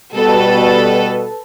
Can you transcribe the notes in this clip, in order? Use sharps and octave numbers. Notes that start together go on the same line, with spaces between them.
B2 G3 A4 B4